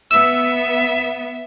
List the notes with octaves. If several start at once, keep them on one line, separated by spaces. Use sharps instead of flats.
B3 E5 E6